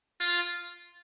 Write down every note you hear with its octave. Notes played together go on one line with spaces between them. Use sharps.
F4